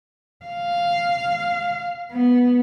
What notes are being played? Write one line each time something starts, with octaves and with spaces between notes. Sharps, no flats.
F5
B3